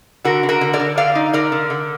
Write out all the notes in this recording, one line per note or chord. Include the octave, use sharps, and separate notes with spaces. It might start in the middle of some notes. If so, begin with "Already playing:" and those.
D3 F#4 A#4
D3
F#4 A#4
D3
A#4 D5
D3
D3 D5 F5
D#4
D3 A#4 D5
D3
D3